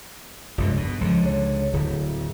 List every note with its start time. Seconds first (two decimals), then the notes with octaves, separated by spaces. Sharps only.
0.58 F1 C#2 G2 B2
0.77 B2
1.01 C#2 D3 F3
1.26 C#5
1.73 D1 D3